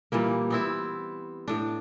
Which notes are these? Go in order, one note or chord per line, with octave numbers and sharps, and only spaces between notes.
A#2 E3 G3 A#3
B3 C4 E4
A2 D4